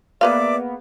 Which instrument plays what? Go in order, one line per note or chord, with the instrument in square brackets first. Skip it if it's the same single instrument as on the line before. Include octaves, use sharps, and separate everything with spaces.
[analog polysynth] A#3 B3 [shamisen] G#4 B4 F5 [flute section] D5 E5 D6